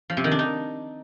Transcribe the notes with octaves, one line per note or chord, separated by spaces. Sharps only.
F3
C3
D#3
D4
D#4